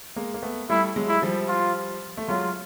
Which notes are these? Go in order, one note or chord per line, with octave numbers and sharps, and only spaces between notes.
G#3 A#3
A#3
A3 B3
G3 A3 E4
F#3 G#3
E4
F3 G3
F4
A3
F#3 G#3 F4